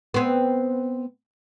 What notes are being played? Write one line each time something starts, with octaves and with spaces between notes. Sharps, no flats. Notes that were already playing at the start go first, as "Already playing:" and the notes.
B3 C4